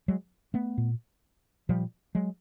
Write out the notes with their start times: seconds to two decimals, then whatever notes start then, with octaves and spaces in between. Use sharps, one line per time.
0.08 F#3 G#3
0.54 A3 B3
0.78 A#2
1.69 A#2 F3 G3
2.15 F#3 G#3